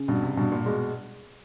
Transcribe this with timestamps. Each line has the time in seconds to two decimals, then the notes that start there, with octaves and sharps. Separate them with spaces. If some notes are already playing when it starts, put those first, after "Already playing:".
Already playing: C#3
0.08 G2 B2
0.22 C3
0.37 G2 B2
0.52 A#2
0.66 B2 G#3